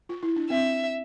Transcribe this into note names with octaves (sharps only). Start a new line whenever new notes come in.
F4
E4
D4
C4 E5